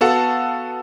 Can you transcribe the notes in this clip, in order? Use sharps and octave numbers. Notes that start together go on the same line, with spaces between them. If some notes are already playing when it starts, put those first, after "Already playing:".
B3 F#4 A4 F5 F#5 A5